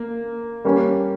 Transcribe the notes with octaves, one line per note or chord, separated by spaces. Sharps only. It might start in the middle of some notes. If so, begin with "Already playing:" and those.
Already playing: A#3
G3 A#3 C#4